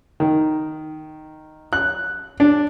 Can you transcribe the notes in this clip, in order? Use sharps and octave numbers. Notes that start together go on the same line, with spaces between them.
D#3
F#6
D4